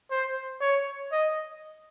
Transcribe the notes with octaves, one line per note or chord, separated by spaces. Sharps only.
C5
C#5
D#5